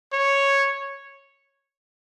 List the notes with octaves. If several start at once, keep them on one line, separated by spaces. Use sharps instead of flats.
C#5